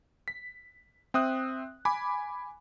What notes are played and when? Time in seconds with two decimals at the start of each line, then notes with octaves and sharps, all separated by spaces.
0.28 B6
1.14 C4 E5 D#6 F#6
1.85 G#5 B5 D6